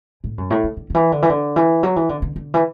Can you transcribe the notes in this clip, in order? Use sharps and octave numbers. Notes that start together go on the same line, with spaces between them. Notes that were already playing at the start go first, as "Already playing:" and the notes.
A2
F#2
A2
D3
D3
D3
E3
D3
E3
D3
E3
F#3
E3
D3
D3
D3
E3